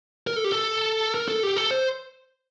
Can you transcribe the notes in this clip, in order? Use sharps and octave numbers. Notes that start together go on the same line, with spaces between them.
A#4
A4
G4
A4
A#4
A4
G4
A4
C5